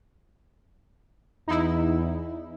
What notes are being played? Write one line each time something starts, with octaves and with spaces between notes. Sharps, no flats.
E2 D#4 E4